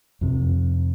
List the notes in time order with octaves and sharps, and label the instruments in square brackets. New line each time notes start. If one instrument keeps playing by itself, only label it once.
[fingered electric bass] F2 C3